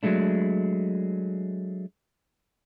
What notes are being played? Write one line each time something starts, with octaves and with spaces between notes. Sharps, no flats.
F#3 G#3 A3 D4